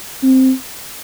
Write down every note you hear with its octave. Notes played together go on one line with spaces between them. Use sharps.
C4